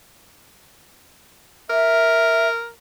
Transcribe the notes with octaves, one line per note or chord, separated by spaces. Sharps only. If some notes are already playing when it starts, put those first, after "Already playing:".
A#4 E5